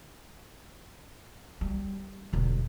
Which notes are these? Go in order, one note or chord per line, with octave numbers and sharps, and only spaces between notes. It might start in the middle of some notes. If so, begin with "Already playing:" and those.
G3
E1 D3